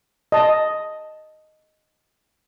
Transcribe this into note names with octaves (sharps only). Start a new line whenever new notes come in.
D#5 A5